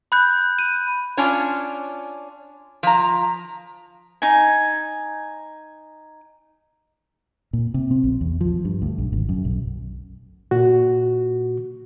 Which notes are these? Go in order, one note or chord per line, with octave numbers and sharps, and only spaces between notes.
B5 F#6 G6
D#7
C#4 D4 F4 C#5
F3 A#5
D#4 G#5
A#2
C3
C4
A#1
E2
F3
G2
D2
B1
G#1
F#2
B1
A#2 F#4